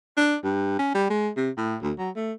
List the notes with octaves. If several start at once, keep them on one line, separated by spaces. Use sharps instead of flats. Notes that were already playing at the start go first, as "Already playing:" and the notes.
D4
G2
C#4
G3
G#3
C3
A2
D2
F#3
A3